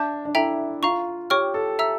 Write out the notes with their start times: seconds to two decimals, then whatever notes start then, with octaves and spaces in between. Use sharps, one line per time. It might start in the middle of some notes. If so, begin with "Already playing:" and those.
Already playing: D4 E5 A5 D6 G6
0.25 D4
0.35 E4 A4 E5 G5 A#5
0.83 F4 F5 A#5 C#6
1.30 G4 C#5 G5 C#6 F6
1.54 A4
1.79 E5 A#5 E6